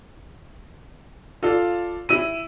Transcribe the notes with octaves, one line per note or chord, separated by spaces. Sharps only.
F4 A4 D5 F5
E4 E6 D#7